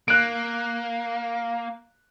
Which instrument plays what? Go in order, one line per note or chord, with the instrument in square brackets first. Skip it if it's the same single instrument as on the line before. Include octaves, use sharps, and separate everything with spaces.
[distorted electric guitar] A#3 [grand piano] F#6 D7